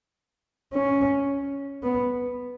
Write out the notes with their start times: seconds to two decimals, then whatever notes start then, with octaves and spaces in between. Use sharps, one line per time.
0.73 C#4
1.83 B3